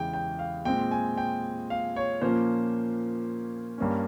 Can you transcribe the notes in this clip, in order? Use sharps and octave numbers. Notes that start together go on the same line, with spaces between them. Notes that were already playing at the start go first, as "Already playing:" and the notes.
Already playing: E2 C#3 E3 G#3 G5
G5
F5
A#2 G#3 C4 G5
G#5
G5
F5
C#5
A#2 F3 A#3 C#4 C5
G2 G3 A#3 C#4